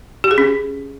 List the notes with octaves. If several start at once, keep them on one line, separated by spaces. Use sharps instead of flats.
G4
G#4
C#4